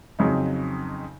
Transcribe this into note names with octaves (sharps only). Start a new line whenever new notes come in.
F2 C#3 F#3 C4 D#4